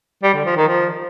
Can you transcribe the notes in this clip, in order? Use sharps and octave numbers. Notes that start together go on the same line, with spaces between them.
G3
D3
F3
D#3
F3